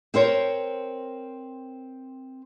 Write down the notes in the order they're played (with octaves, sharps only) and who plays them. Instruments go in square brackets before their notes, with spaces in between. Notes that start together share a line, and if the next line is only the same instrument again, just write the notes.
[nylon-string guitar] C4 A#4 C5 C#5